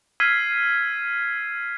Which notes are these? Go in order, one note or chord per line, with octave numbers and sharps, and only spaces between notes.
E6 F6 G#6 B6 C7 D#7